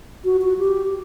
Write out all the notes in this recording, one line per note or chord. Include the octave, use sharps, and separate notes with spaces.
F#4
F#4
G4